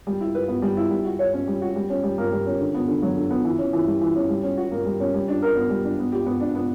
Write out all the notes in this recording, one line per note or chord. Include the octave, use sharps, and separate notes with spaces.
G3
E4
B4
B3
G3
E4
G3
F#4
C#5
C#4
G3
F#4
G3
C#4
G3
A#3
G3
C#4
D3
B3
D3
F#3
D3
B3
E3
C#4
E3
G3
E3
C#4
G3
C#4
F#4
A#3
G3
C#4
G3
D4
A#4
B3
G3
D4
B3
G4
B3
D4
B3